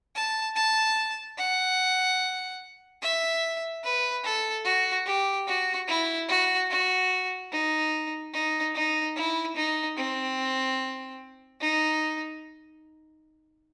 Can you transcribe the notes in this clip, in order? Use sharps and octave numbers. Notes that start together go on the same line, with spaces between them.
A5
A5
F#5
E5
B4
A4
F#4
G4
F#4
E4
F#4
F#4
D#4
D#4
D#4
E4
D#4
C4
D#4